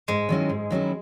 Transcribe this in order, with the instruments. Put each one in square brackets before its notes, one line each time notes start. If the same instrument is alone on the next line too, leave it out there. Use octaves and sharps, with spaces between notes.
[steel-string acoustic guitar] G#2 [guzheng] G#3
[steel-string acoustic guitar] D#3 F#3 C#4 E4
G#2
D#3 F#3 C#4 E4